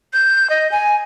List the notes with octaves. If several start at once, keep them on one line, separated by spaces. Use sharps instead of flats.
G6
D#5
G#5